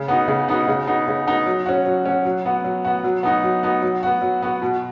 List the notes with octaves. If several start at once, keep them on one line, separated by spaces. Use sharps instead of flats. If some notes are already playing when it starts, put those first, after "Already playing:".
Already playing: C#3
B3 D#4 F#4
C#3
B3 D#4 F#4
C#3
B3 D#4 F#4
C#3
B3 D#4 F#4
F#3
C#4 F#4
F#3
C#4 F#4
F#3
B3 F#4
F#3
B3 F#4
F#3
B3 D#4 F#4
F#3
B3 D#4 F#4
F#3
B3 F#4
F#3
B3 F#4
B2